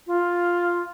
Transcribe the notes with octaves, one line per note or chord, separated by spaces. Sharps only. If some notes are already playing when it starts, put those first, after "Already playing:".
F4